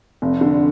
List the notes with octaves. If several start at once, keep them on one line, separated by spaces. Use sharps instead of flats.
F1
D3